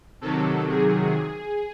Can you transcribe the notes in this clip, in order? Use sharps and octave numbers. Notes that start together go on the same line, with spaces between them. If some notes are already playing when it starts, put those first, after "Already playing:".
C3 D#3 F#3 A4
G#4